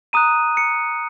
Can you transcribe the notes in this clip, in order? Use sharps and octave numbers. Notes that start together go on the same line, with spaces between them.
A#5 D#6 F#6 D#7
C#7